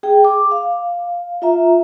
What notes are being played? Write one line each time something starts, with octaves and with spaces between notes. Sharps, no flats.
G#4 G5
D6
F5
F4 E5 A#5